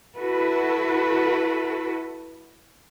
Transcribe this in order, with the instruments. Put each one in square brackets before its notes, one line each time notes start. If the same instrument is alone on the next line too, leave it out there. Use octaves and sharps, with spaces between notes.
[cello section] E4 F#4 A4 B4